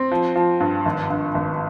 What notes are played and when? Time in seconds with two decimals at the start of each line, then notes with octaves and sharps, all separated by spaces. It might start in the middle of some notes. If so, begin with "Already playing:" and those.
Already playing: C4
0.11 F3
0.35 F3
0.60 G2
0.86 G#1
1.10 G2
1.35 G#1